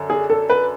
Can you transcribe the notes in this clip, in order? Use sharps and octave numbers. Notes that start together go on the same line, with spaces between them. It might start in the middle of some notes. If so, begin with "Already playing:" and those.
Already playing: F#2 D3
G#4
A4
B4